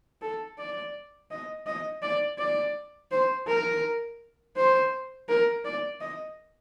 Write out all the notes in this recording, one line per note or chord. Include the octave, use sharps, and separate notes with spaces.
A4
D5
D#5
D#5
D5
D5
C5
A#4
C5
A#4
D5
D#5